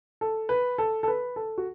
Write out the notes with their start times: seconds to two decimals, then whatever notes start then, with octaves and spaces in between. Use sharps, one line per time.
0.21 A4
0.49 B4
0.78 A4
1.03 A4
1.08 B4
1.36 A4
1.58 F#4